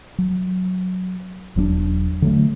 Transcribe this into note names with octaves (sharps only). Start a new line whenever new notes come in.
F#3
E1 F#3 C4 D4
D3 F#3 A3